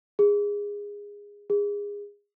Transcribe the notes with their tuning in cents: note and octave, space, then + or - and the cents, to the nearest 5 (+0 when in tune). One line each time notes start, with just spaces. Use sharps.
G#4 -20
G#4 -25